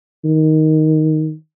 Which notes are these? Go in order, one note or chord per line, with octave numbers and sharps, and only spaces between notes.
D#3